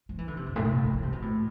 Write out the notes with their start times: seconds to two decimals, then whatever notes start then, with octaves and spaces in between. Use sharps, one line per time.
0.09 F3
0.18 E3
0.28 D3
0.37 C3
0.46 F2
0.56 A2
0.65 C3
0.75 A2
0.84 G2
0.94 E3
1.03 C3
1.12 B2
1.22 A2